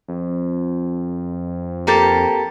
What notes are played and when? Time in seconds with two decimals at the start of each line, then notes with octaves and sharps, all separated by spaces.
0.08 F2
1.87 A#3 G4 A4